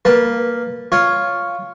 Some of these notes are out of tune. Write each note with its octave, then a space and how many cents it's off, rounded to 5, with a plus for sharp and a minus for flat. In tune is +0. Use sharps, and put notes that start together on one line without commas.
A#3 +0 B4 -20 A5 +0
F4 +0 C#5 +0